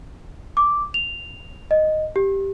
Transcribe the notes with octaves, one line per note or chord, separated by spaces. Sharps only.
D6
F7
D#5
G4